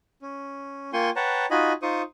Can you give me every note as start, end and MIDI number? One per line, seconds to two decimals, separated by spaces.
0.22 0.91 61
0.93 1.10 58
0.93 1.10 65
0.93 1.10 79
0.93 1.10 80
0.93 1.10 84
0.93 1.10 85
1.16 1.46 71
1.16 1.46 73
1.16 1.46 78
1.16 1.46 79
1.16 1.46 81
1.16 1.46 82
1.51 1.73 63
1.51 1.73 65
1.51 1.73 66
1.51 1.73 75
1.51 1.73 80
1.51 1.73 83
1.82 2.02 63
1.82 2.02 65
1.82 2.02 72
1.82 2.02 85
1.82 2.02 87